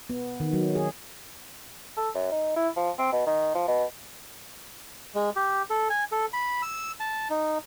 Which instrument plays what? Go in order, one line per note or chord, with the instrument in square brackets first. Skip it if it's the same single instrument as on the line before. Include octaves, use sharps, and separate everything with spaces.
[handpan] B3
D#3
F#3
G#4
[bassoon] A4
F#2
D#4
E4
F3
C4
B2
D#3
F3
B2
[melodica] G#3
G4
A4
G#5
A4
B5
E6
A5
D#4